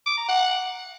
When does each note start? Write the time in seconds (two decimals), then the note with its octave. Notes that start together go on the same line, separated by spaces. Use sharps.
0.06 D6
0.17 A#5
0.28 F#5